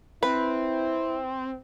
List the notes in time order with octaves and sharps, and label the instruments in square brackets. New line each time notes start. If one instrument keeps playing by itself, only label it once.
[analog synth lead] C4 [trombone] E4 [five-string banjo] B4